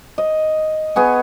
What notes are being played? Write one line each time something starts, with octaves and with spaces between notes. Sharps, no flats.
D#5
B3 G#4 C#6